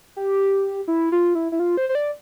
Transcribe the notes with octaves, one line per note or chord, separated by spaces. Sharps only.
G4
E4
F4
E4
E4
F4
C5
C5
D5